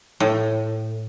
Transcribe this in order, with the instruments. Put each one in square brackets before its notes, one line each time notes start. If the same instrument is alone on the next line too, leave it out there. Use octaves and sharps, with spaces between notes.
[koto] A2